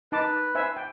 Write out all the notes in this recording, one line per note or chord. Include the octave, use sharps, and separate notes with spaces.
D#4 B4 A5 D6
C5 E5 G#5
G5